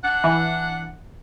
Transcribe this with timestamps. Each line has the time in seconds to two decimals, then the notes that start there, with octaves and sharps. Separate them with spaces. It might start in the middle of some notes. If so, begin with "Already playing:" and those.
0.03 D4 F#5
0.24 E3